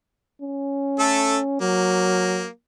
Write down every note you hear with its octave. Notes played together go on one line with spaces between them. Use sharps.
C#4
A3 A4
F#3 A#3